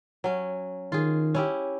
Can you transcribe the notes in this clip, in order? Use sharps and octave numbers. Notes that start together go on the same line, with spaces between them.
F#3 C#4
D#3 F4 G#4
C#4 E4 G4